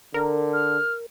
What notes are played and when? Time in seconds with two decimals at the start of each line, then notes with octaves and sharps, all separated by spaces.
0.14 D3 A#4
0.53 F6